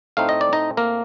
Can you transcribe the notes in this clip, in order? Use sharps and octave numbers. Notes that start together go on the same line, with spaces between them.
A2 A3 C4 D#4 F5
D#5
D5
D#4 D#5
A#3 A#4